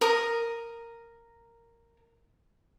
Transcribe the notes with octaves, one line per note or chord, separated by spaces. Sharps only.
A#4 D#6